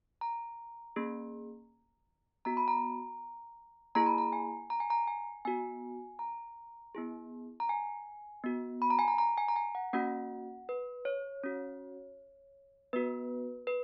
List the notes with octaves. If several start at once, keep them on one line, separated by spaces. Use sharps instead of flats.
A#5
A#3 C#4 G#4
B3 F#4 A#5
B5
A#5
A#3 E4 G#4 A#5
B5
A#5
G#5
A#5
G#5
A#5
G#5
B3 F#4 G#5
A#5
B3 E4 G#4
A#5
G#5
B3 F#4
B5
A#5
G#5
A#5
A#5
G#5
A#5
G#5
F#5
A#3 C#4 F#4 F#5
B4
C#5
C#4 F#4
B3 F#4 B4
B4